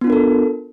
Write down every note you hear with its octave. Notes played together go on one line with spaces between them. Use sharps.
B3 D4 F4 A4 A#4